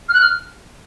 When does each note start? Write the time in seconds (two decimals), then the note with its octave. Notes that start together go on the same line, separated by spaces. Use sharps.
0.09 F6
0.14 F#6
0.21 F6